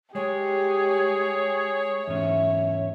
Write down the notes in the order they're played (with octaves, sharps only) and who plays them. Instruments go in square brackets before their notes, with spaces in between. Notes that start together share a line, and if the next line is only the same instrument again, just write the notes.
[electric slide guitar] G#3 [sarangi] G4 [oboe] G#4 [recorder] C#5
[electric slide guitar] E2 G#2 C#4 [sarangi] E5